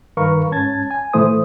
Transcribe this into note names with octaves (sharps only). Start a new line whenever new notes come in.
G2 D#3 A#4 B4 F5 C#6
G#2 C#4 A5 G#6 A6
G#5
A2 E3 A3 E4 C5 D#6